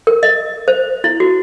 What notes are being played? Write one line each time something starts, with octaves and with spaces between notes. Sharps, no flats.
A#4
D#5
C5
E4
F#4